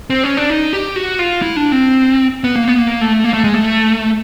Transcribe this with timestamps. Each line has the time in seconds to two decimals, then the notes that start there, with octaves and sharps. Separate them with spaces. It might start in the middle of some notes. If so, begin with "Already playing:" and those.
0.10 C4
0.24 C#4
0.37 D4
0.50 D#4
0.73 G4
0.96 F#4
1.19 F4
1.42 E4
1.56 D4
1.72 C4
2.44 B3
2.56 A#3
2.68 B3
2.78 A#3
3.01 A3
3.24 A#3
3.34 A3
3.44 G#3
3.54 A3